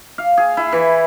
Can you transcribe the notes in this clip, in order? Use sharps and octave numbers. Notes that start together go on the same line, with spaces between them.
F5
G#4
E4
E3